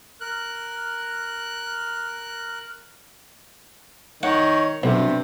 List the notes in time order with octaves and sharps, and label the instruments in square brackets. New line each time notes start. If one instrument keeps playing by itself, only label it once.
[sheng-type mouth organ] A#4 F#6
[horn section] D#3 C#5 [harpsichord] F#5
[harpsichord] B1 [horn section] G2 C3